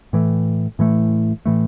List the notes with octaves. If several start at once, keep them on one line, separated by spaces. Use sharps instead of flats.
A2 E3 A3
A2 E3 A3
A2 E3 A3